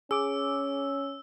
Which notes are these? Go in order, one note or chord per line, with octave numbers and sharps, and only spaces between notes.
C#4 G#4 D6 E6